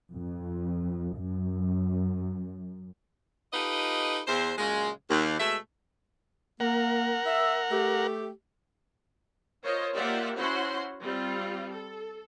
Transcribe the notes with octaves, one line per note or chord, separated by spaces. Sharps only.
F2
F#2
D#4 F4 G4 A4 B4 D#5
E2 C5
A#2 C#3 F#3 G#3
D#2
B2 G#3 A3 E5
A#3 A#4 F#5
E5
A3 G4
F4 A#4 C5 C#5 D#5
A#3 F4 G4 D5 E5 F#5
C#4 E4 F#4 C5 F#5 C6
G3 C4 F4
A4